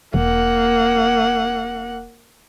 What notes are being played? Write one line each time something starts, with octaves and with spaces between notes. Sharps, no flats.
E1 A#3 F#5